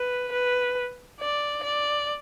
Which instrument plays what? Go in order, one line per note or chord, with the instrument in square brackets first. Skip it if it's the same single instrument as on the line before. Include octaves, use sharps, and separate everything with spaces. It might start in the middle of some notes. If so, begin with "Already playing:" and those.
Already playing: [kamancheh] B4
B4
D5
D5